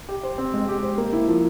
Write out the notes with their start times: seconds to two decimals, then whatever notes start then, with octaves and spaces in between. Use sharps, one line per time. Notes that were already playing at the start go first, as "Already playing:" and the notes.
0.09 G4
0.23 C5
0.38 C4
0.53 G#3
0.69 G4
0.83 C5
0.98 A#3
1.13 E4
1.28 F3